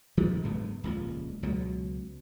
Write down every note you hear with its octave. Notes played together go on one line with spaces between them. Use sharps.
F1 D#3 F3 G#3
F#1 D2 G#2 B3
D#1 C#2 F3
C#2 B2 F#3